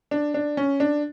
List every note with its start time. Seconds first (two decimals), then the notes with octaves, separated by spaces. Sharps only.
0.11 D4
0.34 D4
0.57 C#4
0.80 D4